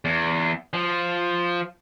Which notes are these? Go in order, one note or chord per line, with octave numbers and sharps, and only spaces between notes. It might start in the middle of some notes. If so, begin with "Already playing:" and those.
E2
F3